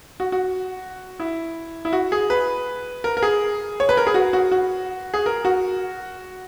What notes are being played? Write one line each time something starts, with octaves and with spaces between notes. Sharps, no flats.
F#4
F#4
E4
E4
F#4
G#4
B4
A#4
A#4
G#4
C#5
B4
A#4
G#4
F#4
F#4
F#4
G#4
A#4
F#4